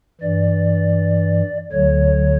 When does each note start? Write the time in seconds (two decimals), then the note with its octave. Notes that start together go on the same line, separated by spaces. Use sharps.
0.21 G2 E3 D5
1.72 D2 D3 F#3 C#5